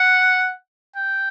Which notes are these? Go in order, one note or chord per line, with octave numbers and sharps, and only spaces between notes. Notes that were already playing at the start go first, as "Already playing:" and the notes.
Already playing: F#5
G5